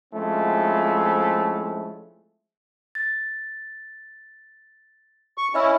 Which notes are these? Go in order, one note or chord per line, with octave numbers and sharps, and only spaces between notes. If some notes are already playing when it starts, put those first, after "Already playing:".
F3 G#3 A3 C4 C#4 E4
A6
C#6
C#4 E4 D#5 E5 E6